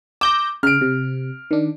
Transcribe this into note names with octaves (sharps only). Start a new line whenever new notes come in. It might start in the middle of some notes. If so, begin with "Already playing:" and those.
D6 E6 G6 A#6
C#3 F6 D7
C3
D#3 D4